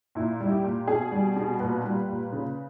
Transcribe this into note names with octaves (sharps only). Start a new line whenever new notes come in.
A#2 E4
G3
E4
G4
A#2
B2 G#4
G3
B2
A#2 B4
G3
A#2
C#3